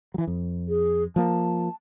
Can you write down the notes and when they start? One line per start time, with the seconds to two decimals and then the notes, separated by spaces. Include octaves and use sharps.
0.14 E3 F#3
0.27 F2
0.68 G#4
1.16 F3 A#3 A5